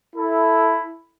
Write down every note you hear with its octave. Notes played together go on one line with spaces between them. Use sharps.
E4 A4